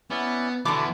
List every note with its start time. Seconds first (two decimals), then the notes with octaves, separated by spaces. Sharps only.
0.11 B3 C#4 E4 D5
0.65 B2 D3 E3 B3 A5 D6